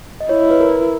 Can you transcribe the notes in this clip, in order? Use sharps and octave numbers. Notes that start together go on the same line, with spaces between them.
D#5
E4 C#5
B4
A#4